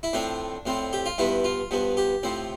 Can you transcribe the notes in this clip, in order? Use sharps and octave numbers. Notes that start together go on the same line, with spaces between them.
E4
A2 F3 C4 D4
A2 F3 C4
G4
F4
G2 F3 B3 E4
F4
G2 F3 B3
G4
A2 F3 C4